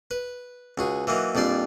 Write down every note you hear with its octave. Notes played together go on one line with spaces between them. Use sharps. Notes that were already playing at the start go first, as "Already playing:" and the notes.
B4
C#2 F#4 G#4
E3 F#3 A#3 D#4
A#1 F2 G3 D5 C6